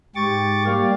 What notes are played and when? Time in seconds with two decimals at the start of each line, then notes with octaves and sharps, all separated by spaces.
0.16 G#2 G4 C#6 D6 A6
0.66 G3 A#3 G4 D5 F5